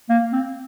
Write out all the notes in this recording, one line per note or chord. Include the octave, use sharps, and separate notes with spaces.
A#3
C4